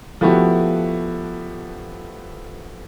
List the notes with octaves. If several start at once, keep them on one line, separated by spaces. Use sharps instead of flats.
F3 A3 B3 E4 F#4 G4